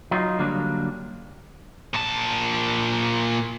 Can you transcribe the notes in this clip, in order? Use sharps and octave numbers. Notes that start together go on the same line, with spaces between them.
F#3 D#4 F4
D3 F#3 G3 A#3 D4
A#2 A5